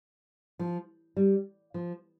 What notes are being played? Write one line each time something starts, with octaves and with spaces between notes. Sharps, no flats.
F3
G3
F3